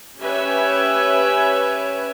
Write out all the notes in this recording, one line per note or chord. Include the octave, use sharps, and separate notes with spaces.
C#4 G4 B4 C#5 E5 G#5